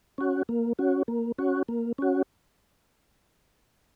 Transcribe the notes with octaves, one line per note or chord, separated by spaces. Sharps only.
C#4 F#4
A#3
C#4 F#4
A#3
C#4 F#4
A#3
C#4 F#4